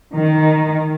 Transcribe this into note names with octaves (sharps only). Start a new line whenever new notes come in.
D#3